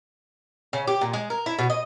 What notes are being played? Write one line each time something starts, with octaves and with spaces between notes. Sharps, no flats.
C#3
G4
A#2
G#3
A#4
E4
B2
D#5